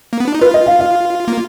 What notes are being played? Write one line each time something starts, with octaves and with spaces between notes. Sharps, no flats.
A#3
B3
D4
D#4
F4 B4
D#5
F5
F5
A#3